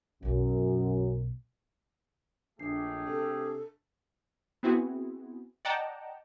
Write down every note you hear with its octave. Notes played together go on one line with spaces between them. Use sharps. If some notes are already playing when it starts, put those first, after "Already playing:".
B1 F#2 B2
A#1 A3 D4 G4 G#4 C7
C3 A4
B3 C4 E4 F#4 G#4
D5 D#5 F#5 G5 A5 A#5